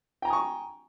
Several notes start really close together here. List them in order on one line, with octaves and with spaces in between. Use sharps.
G5 A#5 G#5 D#6 C#6